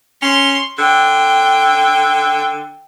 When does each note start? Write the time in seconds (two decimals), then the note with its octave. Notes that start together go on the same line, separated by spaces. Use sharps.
0.22 C#4 C6
0.78 D3 G5